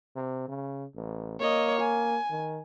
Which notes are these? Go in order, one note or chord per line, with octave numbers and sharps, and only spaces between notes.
C3
C#3
A1
A#3 C#5 D#5
G#5
D#3